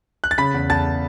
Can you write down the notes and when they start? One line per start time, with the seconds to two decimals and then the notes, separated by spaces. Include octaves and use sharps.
0.24 F#6
0.31 A6
0.38 C#3 B5 B6
0.54 E2
0.70 E2 A5 A6